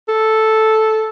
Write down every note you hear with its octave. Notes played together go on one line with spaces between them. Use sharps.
A4